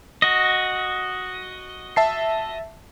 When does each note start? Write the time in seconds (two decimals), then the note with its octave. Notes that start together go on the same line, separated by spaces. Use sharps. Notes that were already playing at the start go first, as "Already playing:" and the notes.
0.22 F#4 D#5
1.96 E5 A5 C7